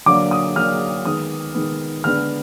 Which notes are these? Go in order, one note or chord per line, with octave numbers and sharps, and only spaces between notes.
D3 F#3 A#3 D4 D6
D#6
D3 F#3 A#3 D4 F6
D#3 G#3 B3 D#6
D#3 G#3 B3
D3 G#3 B3 D4 F6